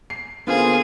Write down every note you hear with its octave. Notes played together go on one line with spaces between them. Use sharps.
C7
D3 A#3 B3 F4 G#4 C5